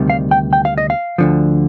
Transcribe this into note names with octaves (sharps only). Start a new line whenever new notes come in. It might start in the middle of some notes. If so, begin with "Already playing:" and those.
Already playing: D2 C3 D#3 G3
F5
G5
G5
F5
D#5
F5
D2 D3 F3